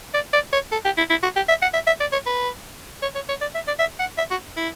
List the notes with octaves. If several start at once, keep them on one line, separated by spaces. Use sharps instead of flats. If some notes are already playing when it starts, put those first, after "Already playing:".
D5
D5
C#5
A4
G4
E4
E4
F#4
G4
E5
F#5
E5
E5
D5
C#5
B4
C#5
C#5
C#5
D5
E5
D5
E5
F#5
E5
F#4
E4